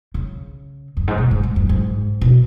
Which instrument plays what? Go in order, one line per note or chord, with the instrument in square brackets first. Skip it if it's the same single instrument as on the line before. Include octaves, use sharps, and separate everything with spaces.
[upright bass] C#3
F#2
G#2
B2
G#2
G#2
F#2
G#2
B2